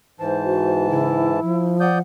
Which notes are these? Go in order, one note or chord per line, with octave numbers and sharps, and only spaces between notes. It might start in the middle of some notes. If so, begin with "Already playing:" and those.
G#2 E3 C5 A5
F#4
C#3 E4
F3
D5 F#5 D#6 G6